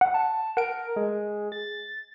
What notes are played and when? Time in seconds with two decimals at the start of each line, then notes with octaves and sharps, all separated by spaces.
0.01 F#5
0.14 A5
0.57 A#4 F#5 D7
0.96 G#3
1.52 A6